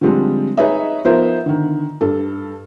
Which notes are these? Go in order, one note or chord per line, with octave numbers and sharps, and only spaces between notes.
D3 F3 G3 G#3 C4 D4
D#4 G#4 B4 C#5 D#5 E5
F3 B3 D#4 A#4 C5 E5
D3 D#3
G2 A4